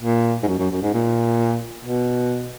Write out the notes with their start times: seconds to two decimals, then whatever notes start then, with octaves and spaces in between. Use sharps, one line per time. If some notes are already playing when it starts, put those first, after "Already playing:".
0.02 A#2
0.43 G#2
0.47 F#2
0.59 F#2
0.71 F#2
0.82 G#2
0.94 A#2
1.85 B2